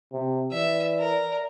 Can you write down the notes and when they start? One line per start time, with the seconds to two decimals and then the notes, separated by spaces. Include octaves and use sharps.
0.12 C3
0.52 E3 D5 E5
0.99 A#4